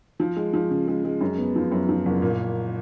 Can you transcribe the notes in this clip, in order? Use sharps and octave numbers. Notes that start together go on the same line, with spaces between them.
F3
G#3
F3
C#3
G#3
G#3
F#2
B3
F3
F#2
F3
F#1
A#2